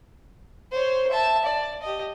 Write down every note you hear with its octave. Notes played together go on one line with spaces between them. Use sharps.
C5 C#5
E5 A5
D5
G4 D#5